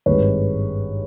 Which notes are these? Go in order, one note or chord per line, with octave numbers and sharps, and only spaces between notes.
G#1 G2 D#3 G#3 B4 C#5